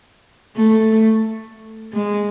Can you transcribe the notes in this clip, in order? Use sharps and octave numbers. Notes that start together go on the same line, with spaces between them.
A3
G#3